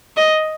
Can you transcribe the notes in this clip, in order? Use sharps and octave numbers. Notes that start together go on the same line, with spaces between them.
D#5